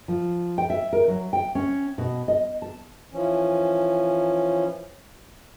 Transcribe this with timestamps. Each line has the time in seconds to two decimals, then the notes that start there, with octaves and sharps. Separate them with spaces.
0.08 F3
0.58 G5
0.70 E5
0.93 A#4
1.08 F#3
1.33 G5
1.55 C#4
1.98 B2
2.28 D#5
2.62 A5
3.13 E3 F3 C#4